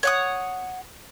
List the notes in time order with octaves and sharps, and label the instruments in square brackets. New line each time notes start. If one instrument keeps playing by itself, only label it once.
[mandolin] C#5 F#5 D#6